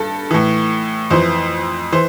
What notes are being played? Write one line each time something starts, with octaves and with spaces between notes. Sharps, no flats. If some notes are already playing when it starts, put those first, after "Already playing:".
Already playing: G2 A4
A2 E3
F2 E3 C5
E3 C5